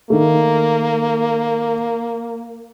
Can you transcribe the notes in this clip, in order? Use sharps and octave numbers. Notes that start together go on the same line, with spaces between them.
D#3 A3 A#3